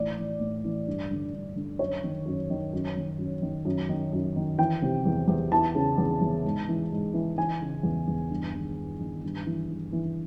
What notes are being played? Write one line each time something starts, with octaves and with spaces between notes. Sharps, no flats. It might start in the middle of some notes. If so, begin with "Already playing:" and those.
Already playing: A2 E3 D5
E3
A2
E3
G2
D3
G2
D3
F#2 C#5
D#3
F#2
D#3
F#2
D#3
F#2
D#3
F#2
D#3
F#2
D#3
E3 G5
C3
E2
E2
E3 A5
C#3
E2
E2
G#2
E3
G#2
E3
E3 G#5
C#3
E2
E2
G2
D#3
G2
D#3
G2
E3
G2
E3